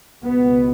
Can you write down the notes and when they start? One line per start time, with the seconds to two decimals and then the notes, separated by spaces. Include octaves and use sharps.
0.24 C#2 B2 B3